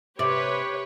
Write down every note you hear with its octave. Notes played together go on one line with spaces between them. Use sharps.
C3 G4 B4 C#5 D5